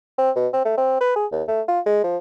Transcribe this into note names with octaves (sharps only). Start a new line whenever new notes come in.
C4
B2
C4
A3
C4
B4
G#4
D#2
A3
F4
G#3
F3